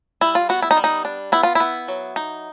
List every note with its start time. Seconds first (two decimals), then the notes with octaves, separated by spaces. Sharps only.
0.21 G3 E4
0.35 F4
0.49 B3 F#4
0.62 E4
0.71 D#4
0.77 G3
0.84 D#4
1.05 D4
1.32 B3 E4
1.43 F4
1.55 B3 E4
1.88 F#3
2.16 D#4